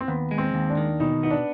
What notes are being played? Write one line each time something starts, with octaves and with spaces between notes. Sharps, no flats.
C4
D#2 B3
G#3
C4
D#2
D4
D#3
B2 D#4
B3 D#4
D4